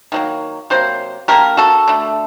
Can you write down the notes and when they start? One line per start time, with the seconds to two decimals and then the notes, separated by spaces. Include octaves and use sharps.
0.12 D#3 F#3 A#3
0.70 C3 F#3 A#3 C5
1.28 D3 F#3 A#3 G4 A#4
1.57 F#4 A4
1.88 D3 A3